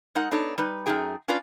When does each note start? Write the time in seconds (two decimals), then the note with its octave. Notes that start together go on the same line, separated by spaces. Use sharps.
0.15 G#3 D#4 A#4 F#5
0.31 B3 D4 D#4 A4 C#5
0.58 G3 D#4 B4
0.86 F#2 G3 A3 D#4 G#4 G5
1.28 C#4 D4 F4 B4 D5